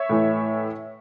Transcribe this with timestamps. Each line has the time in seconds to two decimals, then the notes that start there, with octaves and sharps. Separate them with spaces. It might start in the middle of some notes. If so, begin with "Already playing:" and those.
Already playing: C#5 E5
0.09 A2 E3